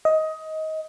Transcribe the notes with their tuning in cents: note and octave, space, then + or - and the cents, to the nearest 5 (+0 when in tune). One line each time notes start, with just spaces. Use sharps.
D#5 +20